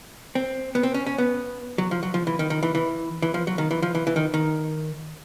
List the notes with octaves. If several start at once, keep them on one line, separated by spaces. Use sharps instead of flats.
C4
B3
C4
C#4
C#4
B3
F#3
F3
F#3
F3
E3
D#3
D#3
E3
E3
E3
F3
F#3
D#3
E3
F3
E3
E3
D#3
D#3